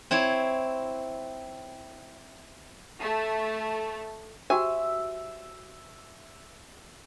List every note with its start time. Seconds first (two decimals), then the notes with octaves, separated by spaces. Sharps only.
0.11 C4 E4 C#5
3.01 A3
4.50 F#4 G4 C5 E5 G#5